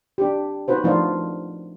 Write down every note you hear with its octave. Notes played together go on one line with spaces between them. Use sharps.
D4 G4
D#4 F#4 B4 C5
F3 A3 D4 D#4 F4